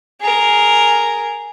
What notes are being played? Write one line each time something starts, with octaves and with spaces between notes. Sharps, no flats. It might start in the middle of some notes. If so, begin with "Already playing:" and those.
G#4 A#4